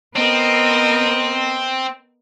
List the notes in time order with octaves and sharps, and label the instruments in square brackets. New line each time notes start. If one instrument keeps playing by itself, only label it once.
[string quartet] B3 A#4 D#5 [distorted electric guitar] C4